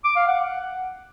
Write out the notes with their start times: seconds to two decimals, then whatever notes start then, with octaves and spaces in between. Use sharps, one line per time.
0.04 D6
0.16 F5
0.27 F#5